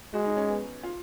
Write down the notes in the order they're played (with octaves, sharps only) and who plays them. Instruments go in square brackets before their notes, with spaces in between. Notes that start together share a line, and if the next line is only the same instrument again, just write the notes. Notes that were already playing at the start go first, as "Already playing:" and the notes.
[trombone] G#3 [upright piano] F#4
[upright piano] D#4
C#4
B3
F4